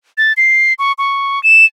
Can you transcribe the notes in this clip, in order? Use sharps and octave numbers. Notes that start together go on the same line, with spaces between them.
A6
C7
C#6
C#6
E7